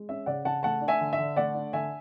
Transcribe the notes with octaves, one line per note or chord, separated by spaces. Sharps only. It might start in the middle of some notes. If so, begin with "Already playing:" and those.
Already playing: G#3
C#4 E5
C#3 D5 F#5
C#3 F#5 A5
A3 F#5 A5
D4
E5 G#5
D3
E5
D3
A3 D5 F#5
D4
D3 E5 G#5